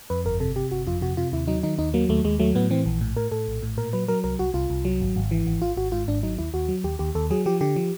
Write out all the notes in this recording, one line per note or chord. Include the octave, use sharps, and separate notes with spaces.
F2 B4
G1 A#4
C3 A4
C3 G4
G1 F#4
F2 F4
C3 F#4
C3 F4
D#2 E4
F#3 D#4
D#3 D#4
D#2 D#4
F#3 A#3
D#2 A3
D#2 G#3
F#3 A3
A2 B3
E3 C4
A#1
A2
A2 A#4
A2 A4
A#1
A2
A#2 A#4
F#3 B4
F#3 A#4
C2 A#4
C2 F#4
C2 F4
C2
F#3
G#1
G#1
E3
G#1
G#1 F4
G#1 F#4
G#2 F4
G#1 D4
F#3 D#4
D#2 E4
D#2 F#4
F#3
D#2 G4
D#2 G4
D#2 A4
F#3 G#4
F3 G4
D3 G4
F3